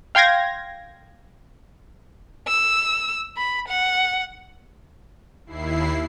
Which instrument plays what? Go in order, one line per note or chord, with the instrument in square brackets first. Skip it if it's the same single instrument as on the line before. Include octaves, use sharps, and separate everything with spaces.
[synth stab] F5 G5 C6 G#6 A#6
[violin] E6
B5
F#5
[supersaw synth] D#2 E4 C7